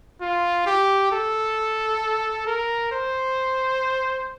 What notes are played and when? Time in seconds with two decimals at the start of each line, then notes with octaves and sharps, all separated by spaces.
0.21 F4
0.66 G4
1.12 A4
2.47 A#4
2.92 C5